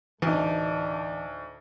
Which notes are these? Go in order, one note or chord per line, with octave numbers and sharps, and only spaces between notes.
D2 A2 E3 D4 D#4